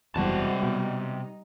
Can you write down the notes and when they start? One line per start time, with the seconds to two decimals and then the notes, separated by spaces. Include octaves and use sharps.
0.16 F#1 E2 C3 G3 G#3 F#4 C5 A5
0.63 B2 D#4